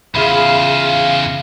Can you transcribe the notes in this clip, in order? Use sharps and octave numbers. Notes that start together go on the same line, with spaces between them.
E2 C#3 F4 G#4 E5 F5 B5